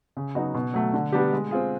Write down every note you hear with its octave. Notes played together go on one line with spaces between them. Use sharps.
C#3
F#3 B3 D#4 F#4
B2
F#3 A3
D3
G3 B3 D4 G4
G#3
C4 F4 G#4